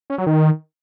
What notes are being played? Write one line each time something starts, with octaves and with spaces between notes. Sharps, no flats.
C#4
F#3
D#3